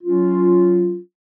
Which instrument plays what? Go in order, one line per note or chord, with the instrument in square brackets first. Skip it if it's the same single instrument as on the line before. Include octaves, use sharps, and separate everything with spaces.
[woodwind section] F#3 C#4 F4